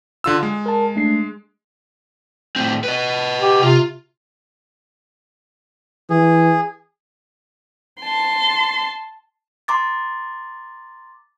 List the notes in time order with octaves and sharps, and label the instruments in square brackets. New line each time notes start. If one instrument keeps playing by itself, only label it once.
[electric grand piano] D3 F4 E6
G#3
[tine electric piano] A#4 A5
A3 D4 C7
[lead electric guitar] A2 C4
B4 D#5
[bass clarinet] G4
[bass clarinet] C3 [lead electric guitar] F4
[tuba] E3 [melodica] G#4
[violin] A5 C6
[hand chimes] A#5 C6 D6 A6